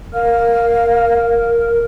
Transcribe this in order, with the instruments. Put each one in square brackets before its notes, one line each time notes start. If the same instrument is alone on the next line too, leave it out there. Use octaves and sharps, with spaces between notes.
[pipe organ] A#4 [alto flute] F5